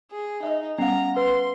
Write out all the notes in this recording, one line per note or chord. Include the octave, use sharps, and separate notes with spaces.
G#4
D#4 D#5 E5
G3 B3 C#4 F5 F#5 A#5 C7
B4 C6